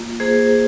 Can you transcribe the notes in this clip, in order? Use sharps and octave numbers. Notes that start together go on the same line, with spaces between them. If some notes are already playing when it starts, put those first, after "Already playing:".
Already playing: A#3 F4
A#3 G#4 C5